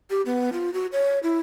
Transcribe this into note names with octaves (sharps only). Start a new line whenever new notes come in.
G4
B3
F4
F#4
C#5
E4